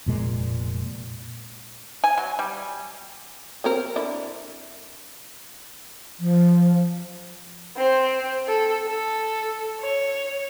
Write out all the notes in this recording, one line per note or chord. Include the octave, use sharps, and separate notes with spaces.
F1 A#2 G#3
G#5
F#3
G3
F#3 C4 A#4
D3 E4
F3
C4 C5
A4
A4
C#5